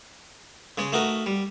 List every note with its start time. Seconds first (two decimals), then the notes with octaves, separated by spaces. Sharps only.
0.78 C#3 G#3 C#5
0.92 A3 D#4 F#4 A#4
1.26 G3